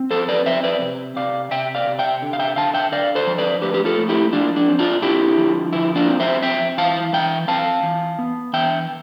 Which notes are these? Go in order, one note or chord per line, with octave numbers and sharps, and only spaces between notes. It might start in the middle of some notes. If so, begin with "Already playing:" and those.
Already playing: C4
F3 A4 C5
B4 D5
C4 C5 E5
B4 D5
C3
C3 D5 F5
C3 E5 G5
D5 F5
C3
E5 G5
D3
F5
E5 G5
D3 F5 A5
E5 G5
D3 D5 F5
A4 C5
F3
B4 D5
A3 G4 B4
G4
F4 A4
A3
E4 G4
F3 D4 F4
D4
C4
D4 F4
D3 E4 G4
F3
F3 E4
D4 F4
C4
C5 E5
C4 E5 G5
E3 F5 A5
E3 E5 G5
C4 F5 A5
E3
B3
E3 E5 G5